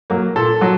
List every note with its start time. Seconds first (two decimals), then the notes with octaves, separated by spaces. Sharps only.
0.10 F#3 A#3
0.36 A#2 A4
0.61 F#3